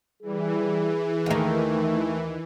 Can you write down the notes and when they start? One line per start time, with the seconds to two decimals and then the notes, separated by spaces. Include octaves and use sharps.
0.22 E3 G3 G#4
1.26 D#2 D#3 A3